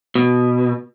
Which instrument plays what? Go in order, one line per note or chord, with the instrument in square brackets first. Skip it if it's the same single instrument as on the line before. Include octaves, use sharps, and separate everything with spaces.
[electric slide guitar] B2